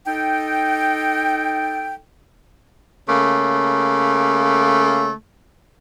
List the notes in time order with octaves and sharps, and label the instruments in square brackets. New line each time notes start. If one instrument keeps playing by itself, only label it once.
[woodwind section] D#4 A4 G5
[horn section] C#3 A3 A#3